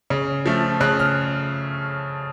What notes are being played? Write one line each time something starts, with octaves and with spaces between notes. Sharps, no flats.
C#3
F3 A3
C#3 F#6
F6